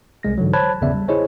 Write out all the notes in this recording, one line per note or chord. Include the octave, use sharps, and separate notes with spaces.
C2 G#3 A#6
G#2 D3 E3 F#3
C5 C#5 A5 B5 F#6 G#6
G1 E2 C#3 B3 D5 E5
G3
E4 G#4 C5 C#5 D#5